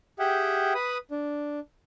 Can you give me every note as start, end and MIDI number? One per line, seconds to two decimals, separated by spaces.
0.19 0.73 67
0.19 0.73 68
0.19 0.73 76
0.19 0.73 78
0.19 0.73 79
0.75 0.98 71
0.75 0.98 83
0.75 0.98 87
1.11 1.60 62